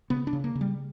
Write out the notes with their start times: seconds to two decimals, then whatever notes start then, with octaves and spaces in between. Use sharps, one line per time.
0.10 C#3 B3
0.27 D4
0.33 C#3
0.44 A#3
0.55 C#3
0.61 G3